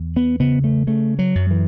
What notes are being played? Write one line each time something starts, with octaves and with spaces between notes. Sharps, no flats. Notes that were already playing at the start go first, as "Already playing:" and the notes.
Already playing: E2
B3
C#3 B3
A3
C#3 A3
F#3
F#2
E3